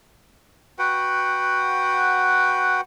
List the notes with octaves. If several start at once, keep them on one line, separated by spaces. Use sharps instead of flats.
F#4 B4 F#5 G5